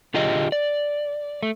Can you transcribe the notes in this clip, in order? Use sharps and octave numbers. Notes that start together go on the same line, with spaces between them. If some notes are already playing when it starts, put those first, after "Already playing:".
D3 F4 G4 G#4 D#5
D5
A3